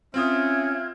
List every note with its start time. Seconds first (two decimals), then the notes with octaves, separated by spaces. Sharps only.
0.14 C4 C#4 F4 E5 D#6 F6 G#6